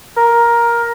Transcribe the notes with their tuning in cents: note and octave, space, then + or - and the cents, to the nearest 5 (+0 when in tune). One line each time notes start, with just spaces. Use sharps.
A#4 +10